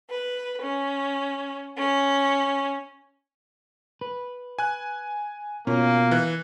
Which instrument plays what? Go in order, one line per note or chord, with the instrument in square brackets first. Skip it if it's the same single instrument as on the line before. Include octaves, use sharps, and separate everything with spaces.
[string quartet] B4
C#4
C#4
[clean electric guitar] B4
[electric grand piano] G#5 F#6
[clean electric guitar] B2 F4 [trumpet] A#3 [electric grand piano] C#4
[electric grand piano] E3 F#6